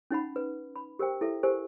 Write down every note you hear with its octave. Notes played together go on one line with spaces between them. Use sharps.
C#4 D#4 F#5 B5
B4
B5
G4 A#4 C5 G5
E4 A4 E5
G4 A#4 C5 G#5